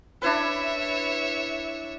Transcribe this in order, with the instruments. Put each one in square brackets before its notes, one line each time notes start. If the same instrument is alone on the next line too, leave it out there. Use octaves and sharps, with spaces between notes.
[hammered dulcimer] D4 E4 B4 [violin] C#5 E5